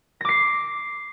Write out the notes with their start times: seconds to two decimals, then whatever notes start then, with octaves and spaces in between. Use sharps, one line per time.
0.21 A#6
0.25 D6
0.29 C7